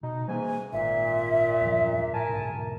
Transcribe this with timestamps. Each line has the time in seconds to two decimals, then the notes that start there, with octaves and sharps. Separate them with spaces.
0.03 B2 D#4
0.28 G#2 E3 G3 A#3 G#5
0.73 G#1 A#2 E5
1.61 E2 G2 F3
2.13 A2 A#4 G#5 A5
2.29 B1 G#2 B2